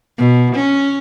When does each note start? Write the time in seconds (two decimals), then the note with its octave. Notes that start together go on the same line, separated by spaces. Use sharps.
0.18 B2
0.55 C#4